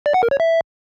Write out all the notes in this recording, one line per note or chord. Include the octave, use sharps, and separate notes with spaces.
D5
F#5
A#4
C#5
E5